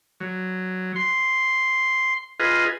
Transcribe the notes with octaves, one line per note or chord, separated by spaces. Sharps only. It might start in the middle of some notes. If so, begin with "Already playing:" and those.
F#3
C6
F4 G#4 B4 D#5